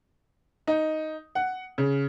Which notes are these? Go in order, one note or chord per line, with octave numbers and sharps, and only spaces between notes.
D#4
F#5
C#3